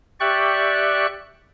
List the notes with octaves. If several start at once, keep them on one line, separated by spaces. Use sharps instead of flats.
G4 D5 E5 G5 C#6 F#6